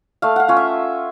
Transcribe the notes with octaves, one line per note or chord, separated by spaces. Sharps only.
A3 F5
F5 F#5
C#4 F4
E5